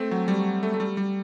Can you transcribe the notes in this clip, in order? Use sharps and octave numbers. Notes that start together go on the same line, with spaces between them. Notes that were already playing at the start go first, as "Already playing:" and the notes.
Already playing: A3 C4
F#3
G3
A3
A3
G3
G3